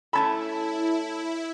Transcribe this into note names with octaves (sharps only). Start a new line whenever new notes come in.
A3 C#4 E4 A4 A5 B5